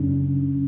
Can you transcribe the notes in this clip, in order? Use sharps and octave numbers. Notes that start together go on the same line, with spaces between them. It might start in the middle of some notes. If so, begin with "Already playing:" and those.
Already playing: F#2 C#3 D4